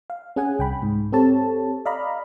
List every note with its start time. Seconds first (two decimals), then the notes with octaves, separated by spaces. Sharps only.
0.10 F5
0.36 C#4 G#4 F#5 G#5
0.59 C2 G5 B5
0.82 G#2
1.12 C4 G4 A4 C#5 A5
1.86 D5 D#5 F5 A#5 B5